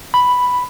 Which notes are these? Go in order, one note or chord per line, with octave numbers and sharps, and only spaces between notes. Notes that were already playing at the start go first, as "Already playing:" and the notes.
B5